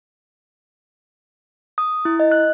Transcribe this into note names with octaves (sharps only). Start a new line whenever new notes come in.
D#6
E4
D#5
F#6